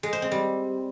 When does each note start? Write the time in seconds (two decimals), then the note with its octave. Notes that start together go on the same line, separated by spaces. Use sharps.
0.03 G#3
0.13 C5
0.22 C4
0.32 G3